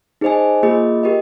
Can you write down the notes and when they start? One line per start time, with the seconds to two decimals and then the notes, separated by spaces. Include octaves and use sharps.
0.21 D#4 G#4 C5 D#5 G#5
0.63 A#3 F4 G#4 D#5
1.03 G4 A#4 D#5